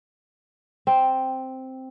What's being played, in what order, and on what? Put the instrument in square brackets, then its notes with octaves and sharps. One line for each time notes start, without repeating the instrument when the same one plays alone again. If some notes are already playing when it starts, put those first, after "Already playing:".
[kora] C4